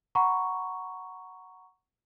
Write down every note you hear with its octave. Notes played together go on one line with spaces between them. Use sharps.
F#5 A#5 B5 C#6